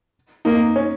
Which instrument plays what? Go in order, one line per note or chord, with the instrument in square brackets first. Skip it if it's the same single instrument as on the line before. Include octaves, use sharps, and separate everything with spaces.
[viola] A#3 [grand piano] D#4
[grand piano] C#4